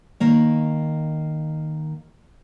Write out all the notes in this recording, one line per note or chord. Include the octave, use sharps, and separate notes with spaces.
D#3 A#3 C#5